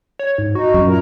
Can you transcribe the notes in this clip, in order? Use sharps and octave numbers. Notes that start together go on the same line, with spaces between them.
C#5
G#2
D#4 F#4
F#2
A#2 E4 A#4